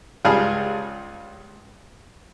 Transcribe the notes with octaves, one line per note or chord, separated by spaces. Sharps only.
C#2 G3 G#4 F5 G#5 A5